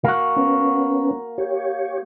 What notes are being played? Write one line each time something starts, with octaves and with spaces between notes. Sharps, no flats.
A#3 F#4
B3 C#4
G4 C#5